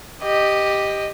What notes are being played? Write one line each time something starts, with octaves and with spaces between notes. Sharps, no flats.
G4 D#5